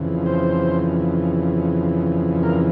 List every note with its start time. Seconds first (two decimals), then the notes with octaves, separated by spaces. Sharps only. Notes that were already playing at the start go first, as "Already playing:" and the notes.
Already playing: F2 C#3 E3
0.26 C5
2.43 A#4